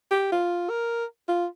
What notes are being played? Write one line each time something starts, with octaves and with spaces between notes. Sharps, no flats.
G4
F4
A#4
F4